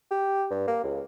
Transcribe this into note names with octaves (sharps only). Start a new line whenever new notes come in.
G4
G2
A#3
C#2